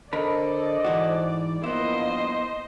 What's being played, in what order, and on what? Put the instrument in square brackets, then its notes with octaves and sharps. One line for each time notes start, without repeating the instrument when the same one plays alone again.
[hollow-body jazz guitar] D3 A#4 B5 [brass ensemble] A4 C5 D#5 [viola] D5
[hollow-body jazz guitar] G#2 E3 F#4
[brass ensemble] G2 F3 A#3 [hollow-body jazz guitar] B3 E4 [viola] C5 D#5